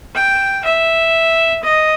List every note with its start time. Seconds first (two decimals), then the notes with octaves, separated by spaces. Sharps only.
0.14 G5
0.64 E5
1.62 D#5